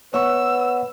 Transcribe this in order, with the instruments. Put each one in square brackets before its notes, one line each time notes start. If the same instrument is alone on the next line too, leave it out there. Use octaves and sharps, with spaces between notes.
[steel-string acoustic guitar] B3 E5 F#5 [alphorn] B4 [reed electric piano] C#5 C#6 [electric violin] E6